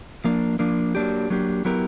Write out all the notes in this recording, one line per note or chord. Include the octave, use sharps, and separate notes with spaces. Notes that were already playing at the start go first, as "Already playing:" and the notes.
F3 A#3 D4
F3 A#3 D4
F#3 A#3 D4 G4
F#3 A#3 D4 G4
F#3 B3 E4 G4 A#4